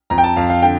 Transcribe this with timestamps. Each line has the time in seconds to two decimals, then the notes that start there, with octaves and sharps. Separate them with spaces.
0.10 F2 A#5
0.18 G5
0.24 A5
0.36 F2 F5
0.50 F5
0.62 D3 G5